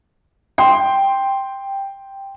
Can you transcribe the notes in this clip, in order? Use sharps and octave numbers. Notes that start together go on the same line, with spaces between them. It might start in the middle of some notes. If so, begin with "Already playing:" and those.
G5 C6